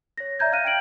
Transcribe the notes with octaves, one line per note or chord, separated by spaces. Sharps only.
C#5 A#6
D5 E5 A#5 G6 G#6
F5 F6 F#6 A#6 D#7
G5 G#6 D7 F#7